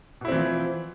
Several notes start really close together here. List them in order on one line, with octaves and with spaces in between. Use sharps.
B2 E4 C4 E3 F3